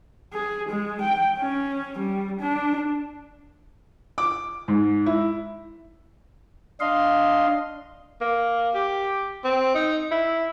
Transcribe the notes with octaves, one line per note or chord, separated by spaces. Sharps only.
G#4
G#3
G5
C#4
G3
D4
D6
G#2
E4
D4 D#5 F5 C6
A#3
G4
C4
D#4
E4